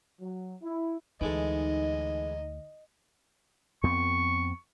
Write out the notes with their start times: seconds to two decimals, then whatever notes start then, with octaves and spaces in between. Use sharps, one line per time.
0.20 F#3
0.62 E4
1.21 D2 E3 G#3 D#4 A4 D#5
3.83 F2 B3 C4 C#6